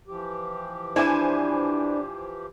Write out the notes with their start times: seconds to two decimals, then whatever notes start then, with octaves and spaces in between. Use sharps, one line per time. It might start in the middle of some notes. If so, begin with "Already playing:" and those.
0.07 E3 F3 G4
0.96 D4 E4 C5 E5 G#5 D6